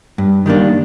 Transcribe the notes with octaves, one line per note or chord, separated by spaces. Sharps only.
G2
D#3 G3 A#3 D4